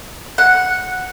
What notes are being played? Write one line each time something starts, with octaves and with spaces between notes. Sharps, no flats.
F#5